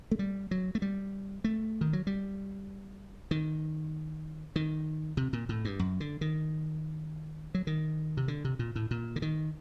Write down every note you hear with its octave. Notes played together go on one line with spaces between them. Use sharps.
A3
G3
F#3
A3
G3
A3
D#3
F#3
G3
D#3
D#3
C3
A#2
A2
G2
F#2
D3
D#3
F#3
D#3
C3
D3
C3
A#2
A2
A#2
D3
D#3